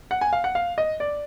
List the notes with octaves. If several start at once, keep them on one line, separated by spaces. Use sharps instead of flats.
F#5
G#5
F5
F#5
F5
D#5
D5